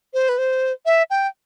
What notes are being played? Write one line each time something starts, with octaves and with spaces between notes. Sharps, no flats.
C5
B4
C5
E5
G5